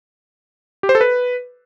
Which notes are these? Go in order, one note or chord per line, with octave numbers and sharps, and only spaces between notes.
G4
C5
A4
B4